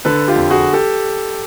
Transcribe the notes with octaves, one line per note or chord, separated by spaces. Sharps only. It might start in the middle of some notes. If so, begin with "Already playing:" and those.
D3 A4 B4
F4 G4
F2
F#4 G#4
G4 A4